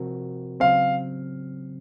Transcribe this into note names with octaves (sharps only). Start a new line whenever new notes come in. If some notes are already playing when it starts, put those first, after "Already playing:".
Already playing: C3 F3 C4 F#4 A#4
C#3 F#3 C4 F5